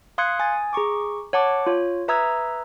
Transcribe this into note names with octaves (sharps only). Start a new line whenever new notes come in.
F5 C6 D#6 F#6 G#6 C#7
G#5 D#6 A6
G#4 A#5 C#6 D6
C#5 F#5 A5 D6
F4 C#5
B4 E5 A#5 D#6 E6 G#6